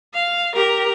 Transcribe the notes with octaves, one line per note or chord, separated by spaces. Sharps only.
F5
G4 A#4